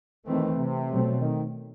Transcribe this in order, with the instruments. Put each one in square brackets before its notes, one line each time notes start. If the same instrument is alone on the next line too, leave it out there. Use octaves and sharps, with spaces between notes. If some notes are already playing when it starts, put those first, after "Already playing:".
[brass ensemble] D#3 [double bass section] E3 A3 C4
[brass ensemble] C3
[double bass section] B2 F#3 A3 C4
[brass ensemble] D#3